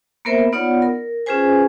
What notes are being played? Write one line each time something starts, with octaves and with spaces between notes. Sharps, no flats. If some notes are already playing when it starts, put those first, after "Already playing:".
A#3 B3 A#4 C5 E5
B3 D#4 F4 C#5 D5 F#5
A#4
C#4 F4 G#4 B4 C5 G#5